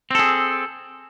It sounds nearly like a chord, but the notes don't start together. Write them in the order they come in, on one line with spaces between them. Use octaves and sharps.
C4 A4 G#4